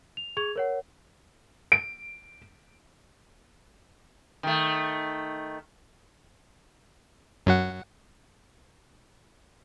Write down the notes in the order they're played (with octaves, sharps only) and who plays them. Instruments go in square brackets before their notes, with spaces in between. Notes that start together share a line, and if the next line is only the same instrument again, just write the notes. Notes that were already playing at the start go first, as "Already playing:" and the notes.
[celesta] F7
G#4 C#6 G#6 F7
A#4 C#5 F#5
[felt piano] D7
[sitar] D#3 A3
[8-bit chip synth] F#2 F#3 F#5